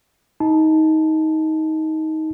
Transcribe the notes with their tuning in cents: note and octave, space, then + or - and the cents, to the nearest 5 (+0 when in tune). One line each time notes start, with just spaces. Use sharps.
D#4 +20 A5 -15